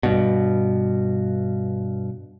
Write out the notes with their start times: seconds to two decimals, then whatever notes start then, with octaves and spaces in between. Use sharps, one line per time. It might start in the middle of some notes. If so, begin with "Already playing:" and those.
0.03 G2 B2